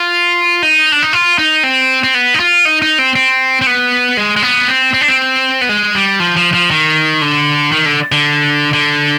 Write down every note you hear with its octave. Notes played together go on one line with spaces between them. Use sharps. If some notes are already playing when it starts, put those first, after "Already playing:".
Already playing: F4
D#4
D4
D#4
F4
D#4
C4
C4
B3
D#4
F4
D#4
D#4
C4
C4
C4
B3
G#3
G#3
B3
C4
C4
D4
C4
B3
G#3
G3
F3
F3
F3
D#3
D3
D#3
D3
D3
D3